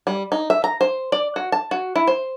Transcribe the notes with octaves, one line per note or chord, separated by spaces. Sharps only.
G3
D#4
E5
A#5
C5
D5
F#4
A5
F#4
E4
C5